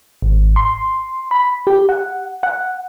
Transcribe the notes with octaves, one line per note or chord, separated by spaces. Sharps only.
G#1
C6
B5
G4
F#5
F#5